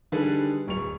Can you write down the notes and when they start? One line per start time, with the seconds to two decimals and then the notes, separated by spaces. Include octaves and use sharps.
0.12 D3 D#3 G3 G#4 A4 B4
0.68 D1 C#6 F7